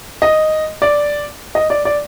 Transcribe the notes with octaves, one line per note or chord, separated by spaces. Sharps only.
D#5
D5
D#5
D5
D5